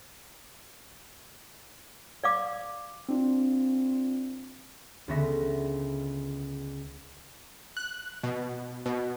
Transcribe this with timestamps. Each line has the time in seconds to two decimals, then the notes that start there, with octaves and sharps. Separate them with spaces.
2.24 D5 F5 D6
3.09 C4 D4 F4
5.08 C#2 D3 B3 E5 C#6 A#6
7.77 F#6
8.23 B2
8.86 B2